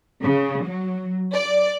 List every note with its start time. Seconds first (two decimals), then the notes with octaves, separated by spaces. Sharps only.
0.23 C#3
0.66 F#3
1.34 D5